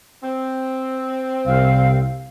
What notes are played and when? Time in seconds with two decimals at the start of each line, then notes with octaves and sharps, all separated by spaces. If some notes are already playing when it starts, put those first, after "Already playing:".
0.23 C4
1.47 C2 F5